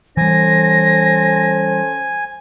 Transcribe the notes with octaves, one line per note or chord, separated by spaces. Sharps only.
E3 G3 C#4 A4 C5 G#5 A#6